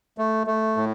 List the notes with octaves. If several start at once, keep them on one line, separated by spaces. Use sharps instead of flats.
A3
A3
A2